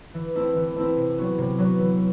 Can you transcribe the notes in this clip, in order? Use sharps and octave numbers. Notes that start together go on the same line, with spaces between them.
E3
A3 C4 E4
E3
A3 C4 E4
C3
F#3 B3 F#4
C3
F#3 B3 F#4
E3